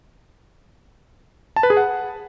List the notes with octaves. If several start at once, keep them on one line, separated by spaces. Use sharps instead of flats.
A5
B4
G#4
F#5